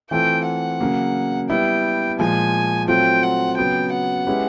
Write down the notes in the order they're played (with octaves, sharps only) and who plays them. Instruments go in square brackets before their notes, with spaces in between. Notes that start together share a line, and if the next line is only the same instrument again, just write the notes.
[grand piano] E3 A3 C4 F4 A4 [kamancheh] G5
[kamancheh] F#5
[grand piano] C#3 F#3 A#3
[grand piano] G3 B3 E4 [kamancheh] G5
[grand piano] A#2 F3 G#3 [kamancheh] G#5
[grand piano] F#3 A3 C4 F4 [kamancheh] G5
[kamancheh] F#5
[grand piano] C#3 F#3 B3 [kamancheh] G5
[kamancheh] F#5
[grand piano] G#3 C#4 E4 G4 B4